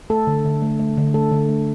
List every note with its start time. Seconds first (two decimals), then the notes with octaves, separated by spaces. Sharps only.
0.10 A3 A4
0.27 D3
0.45 D3
0.62 A3
0.80 A3
0.97 D3
1.14 A3 A4
1.32 D3
1.49 A3